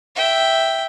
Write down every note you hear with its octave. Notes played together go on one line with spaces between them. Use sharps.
E5 G5